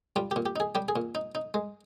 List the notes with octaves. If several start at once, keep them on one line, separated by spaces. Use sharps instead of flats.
G3 F4
A#2 G4
G4
D#4 G#4
G3 G4
G#4
A#2
D#4
D#4
G#3